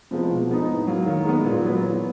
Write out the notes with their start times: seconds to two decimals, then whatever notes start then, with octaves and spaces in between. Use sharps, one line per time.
0.11 C3 F3 G#3 B3
0.30 B2
0.49 G#3 B3 D#4
0.69 A2
0.87 F#3 A#3
1.06 D#3
1.25 G#3 B3
1.44 A#2
1.63 F#3 B3
1.83 E3